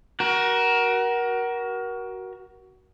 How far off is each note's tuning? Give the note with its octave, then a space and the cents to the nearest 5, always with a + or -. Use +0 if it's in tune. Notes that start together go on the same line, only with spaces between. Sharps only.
F#4 +20 A#4 +25